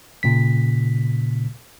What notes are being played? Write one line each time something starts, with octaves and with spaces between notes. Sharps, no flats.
A#2 C#3 B6